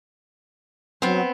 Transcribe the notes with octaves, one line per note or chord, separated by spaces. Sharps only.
F#3 B3 C4